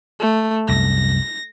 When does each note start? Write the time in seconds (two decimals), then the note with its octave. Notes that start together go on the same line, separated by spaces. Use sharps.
0.20 A3
0.69 C2 F#2 A#6